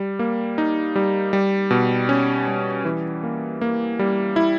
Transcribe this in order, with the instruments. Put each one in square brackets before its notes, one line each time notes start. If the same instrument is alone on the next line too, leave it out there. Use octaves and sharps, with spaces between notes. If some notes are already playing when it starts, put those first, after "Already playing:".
Already playing: [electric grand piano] G3
A#3
D#4
G3
G3
B2
C#4
G3
E3
A#3
A#3
G3
E4